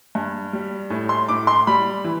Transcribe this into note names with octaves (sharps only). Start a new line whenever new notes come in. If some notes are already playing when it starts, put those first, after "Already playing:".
G2
G3
A2
C6
A2 D6
C6
G3 B5
E3